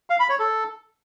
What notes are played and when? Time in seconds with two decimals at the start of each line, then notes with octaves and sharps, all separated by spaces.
0.10 F5
0.20 B5
0.29 C#5
0.39 A4